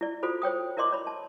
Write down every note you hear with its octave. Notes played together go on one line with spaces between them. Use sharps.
E4 D5
F4 F#4 A4 C5 B5
C5 C#5 G5 D#6
E4 A#4 D5 D#5 C6 D6
C#5 B5
A5